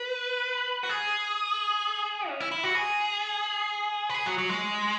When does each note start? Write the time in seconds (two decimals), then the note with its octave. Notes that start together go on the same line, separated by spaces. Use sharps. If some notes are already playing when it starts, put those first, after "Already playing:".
Already playing: B4
0.83 F#4
0.89 G#4
2.29 C#4
2.40 E4
2.52 E4
2.63 F#4
2.75 G#4
4.10 B4
4.14 G#4
4.26 F#3
4.38 F#3
4.49 G#3